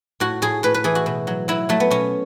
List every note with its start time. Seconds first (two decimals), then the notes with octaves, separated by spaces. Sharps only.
0.20 A2 F#4
0.42 A2 G#4
0.63 A2 B4
0.74 B4
0.84 E3 G#4
0.95 F#4
1.06 B2
1.27 F#3
1.48 F#3 E4
1.69 F#3 A3
1.80 B3
1.90 B2 C#4